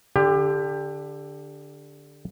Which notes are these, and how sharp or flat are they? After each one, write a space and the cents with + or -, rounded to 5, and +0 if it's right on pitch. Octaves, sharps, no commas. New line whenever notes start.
D3 +0 G4 +25